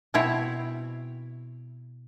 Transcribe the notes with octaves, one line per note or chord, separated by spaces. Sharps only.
B2 C4 E4 C#5